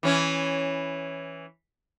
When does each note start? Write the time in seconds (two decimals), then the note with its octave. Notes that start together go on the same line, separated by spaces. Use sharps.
0.03 E3 C#4